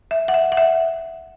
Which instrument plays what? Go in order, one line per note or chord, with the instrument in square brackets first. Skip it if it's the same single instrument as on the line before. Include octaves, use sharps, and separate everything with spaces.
[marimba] E5
F#5
E5
F#5
E5